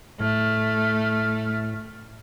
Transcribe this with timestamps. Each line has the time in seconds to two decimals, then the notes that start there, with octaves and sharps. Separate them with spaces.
0.20 A2 A3 F6